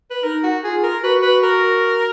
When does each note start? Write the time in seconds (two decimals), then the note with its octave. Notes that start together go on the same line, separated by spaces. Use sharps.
0.11 B4
0.24 D#4 A#4
0.44 F#4
0.63 F4 G#4
0.83 A#4
1.04 F#4 B4
1.22 B4
1.43 A#4